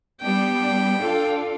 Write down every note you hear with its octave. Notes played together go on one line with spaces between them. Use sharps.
G3 B3 D4 G5
D4 F4 A4